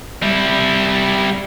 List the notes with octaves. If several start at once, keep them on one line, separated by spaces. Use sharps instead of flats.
G3 E4